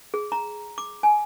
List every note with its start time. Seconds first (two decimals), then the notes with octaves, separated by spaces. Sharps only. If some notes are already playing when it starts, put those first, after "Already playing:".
0.14 G#4
0.32 A#5
0.78 D6
1.03 G#5